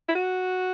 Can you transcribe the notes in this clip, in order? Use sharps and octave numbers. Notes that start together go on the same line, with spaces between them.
E4
F#4